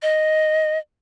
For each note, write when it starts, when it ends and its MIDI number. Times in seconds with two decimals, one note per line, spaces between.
0.02 0.78 75